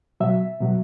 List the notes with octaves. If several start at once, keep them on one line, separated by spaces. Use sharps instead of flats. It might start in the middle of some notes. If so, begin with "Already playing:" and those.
B2 F#3 E5
B2 F#3